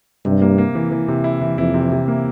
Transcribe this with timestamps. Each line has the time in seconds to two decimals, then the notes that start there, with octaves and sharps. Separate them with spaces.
0.25 G2 C3
0.42 A#3
0.58 A#3
0.75 E3
0.92 E3
1.08 C3
1.24 E4
1.41 E3
1.57 F2 E4
1.74 C3
1.92 C3
2.08 A#3